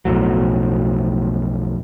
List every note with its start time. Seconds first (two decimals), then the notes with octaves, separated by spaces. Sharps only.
0.05 B1 F2 A2 F#3